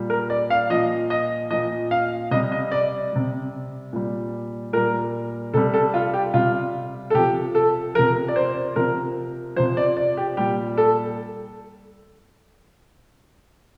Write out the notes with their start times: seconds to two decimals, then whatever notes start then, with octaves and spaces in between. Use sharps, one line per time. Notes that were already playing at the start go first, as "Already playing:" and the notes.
Already playing: A#2 G3
0.10 A#4
0.30 D5
0.50 F5
0.70 A#2 F3 D#5
1.10 D#5
1.50 A#2 F3 D#5
1.91 F5
2.31 C3 G3 D#5
2.52 D#5
2.72 D5
3.12 C3 G3
3.93 A#2 G3
4.73 A#2 G3 A#4
5.54 C3 G3 A4
5.74 A4
5.94 F4
6.14 G4
6.34 C3 G3 F4
7.10 A4
7.14 C3 F3 G4
7.55 A4
7.95 C3 F3 A#4
8.28 D5
8.36 C5
8.76 C3 F3 A#4
9.56 F3 C5
9.59 C3
9.77 D5
9.97 D5
10.17 G4
10.37 A#2 G3 G4
10.78 A4